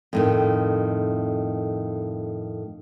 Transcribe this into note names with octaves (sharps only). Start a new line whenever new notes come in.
F2 A2 D#3